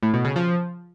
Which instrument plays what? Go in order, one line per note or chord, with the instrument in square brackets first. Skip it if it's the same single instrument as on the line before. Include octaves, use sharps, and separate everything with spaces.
[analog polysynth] A2
B2
C#3
F3